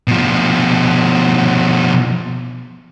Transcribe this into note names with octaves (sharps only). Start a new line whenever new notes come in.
B2 F3